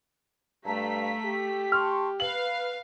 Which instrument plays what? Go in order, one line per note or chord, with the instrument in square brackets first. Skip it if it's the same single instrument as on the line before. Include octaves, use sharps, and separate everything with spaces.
[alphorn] G2 [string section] A3 B6 [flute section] F5 A5 A#5
[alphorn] G4
[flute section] A5 C6 C#6 [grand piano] F6
[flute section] B4 [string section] F5 [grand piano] F#7